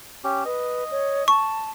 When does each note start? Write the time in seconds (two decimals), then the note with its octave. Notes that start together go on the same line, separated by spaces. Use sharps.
0.24 C#4 G4
0.45 B4 D#5
0.91 C#5
1.28 A5 C#6